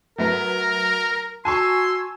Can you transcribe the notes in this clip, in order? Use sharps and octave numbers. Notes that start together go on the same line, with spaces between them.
F#3 A3 A#4 B4
F#4 G#5 A5 C6 C#6 E6 G#6